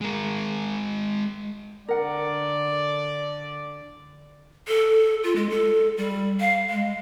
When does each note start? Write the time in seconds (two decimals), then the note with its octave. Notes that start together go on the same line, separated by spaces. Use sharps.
0.01 G#3 A#4
1.88 D3 A#4 D5 F#5
4.68 A4
5.24 F4
5.36 G#3
5.50 A4
5.97 G3
6.40 F5
6.70 G#3